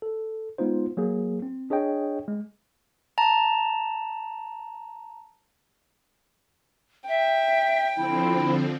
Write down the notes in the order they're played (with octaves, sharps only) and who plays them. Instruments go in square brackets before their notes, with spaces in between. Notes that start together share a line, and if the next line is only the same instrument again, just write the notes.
[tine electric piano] A4
G#3 B3 D#4 F4 C5
F#3 A#3 G#4
C4
D4 G#4 C#5 D#5 G5
G#3
[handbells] A5 A#5
[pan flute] E5 [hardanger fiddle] G5
[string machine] D3 F3 C4 [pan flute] E4